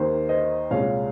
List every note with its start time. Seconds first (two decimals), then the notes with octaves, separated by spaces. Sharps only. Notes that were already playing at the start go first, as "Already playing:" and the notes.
Already playing: D#2 D#3 A#3 C5
0.29 C5 D#5
0.71 C2 A#2 G#3 C#5 F5